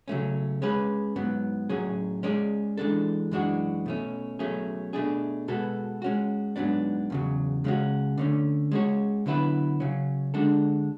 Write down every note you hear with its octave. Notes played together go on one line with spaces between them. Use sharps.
C#3 F#3 A3 C#4
G#3 C#4 G#4 B4
G#2 F#3 B3
A2 F#3 C#4 G#4
G#3 C#4 G#4 D5
E3 G#3 D4 A4
F#2 E3 G#3 D4 F#4
B2 A3 C#4
B2 F#3 A3 C#4 G#4
B2 A3 D4 G#4
B2 G#3 B3 F#4 A4
G#3 C#4 F#4
G#2 F#3 B3 D4
E2 C#3 F#3
C#3 G#3 C#4 F#4
D3 A3 C#4
G#3 C#4 F#4 C#5
D3 F#3 B3 E4 B4
C#3 F#3 C#4
D3 G#3 D4 F#4 A4